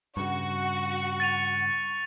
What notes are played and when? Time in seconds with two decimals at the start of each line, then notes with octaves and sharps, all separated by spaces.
0.17 G2 C#3 F#4 C#6
1.20 A6 D#7 F7